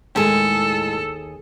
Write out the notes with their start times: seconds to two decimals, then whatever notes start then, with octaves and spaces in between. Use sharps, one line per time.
0.16 D#2 A2 G#3 G#4 A4